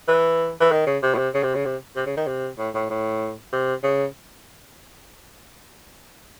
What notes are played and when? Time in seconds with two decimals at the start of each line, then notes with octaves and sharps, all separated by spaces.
0.08 E3
0.60 E3
0.72 D#3
0.87 C#3
1.03 C3
1.14 A2
1.18 C3
1.34 C#3
1.43 C3
1.55 C#3
1.65 C3
1.96 C3
2.06 C#3
2.17 D#3
2.27 C3
2.58 A2
2.75 A2
2.90 A2
3.52 C3
3.83 C#3